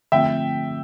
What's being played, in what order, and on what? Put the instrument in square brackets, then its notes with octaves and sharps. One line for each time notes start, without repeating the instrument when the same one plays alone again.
[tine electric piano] D3 F3 A3 C4 F4 [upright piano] E5 G5